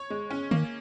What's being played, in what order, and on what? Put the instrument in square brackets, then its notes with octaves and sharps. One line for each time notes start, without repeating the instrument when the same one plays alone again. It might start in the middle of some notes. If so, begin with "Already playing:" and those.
Already playing: [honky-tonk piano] C#5
G#3
C#4
[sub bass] D#3 [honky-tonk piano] A#3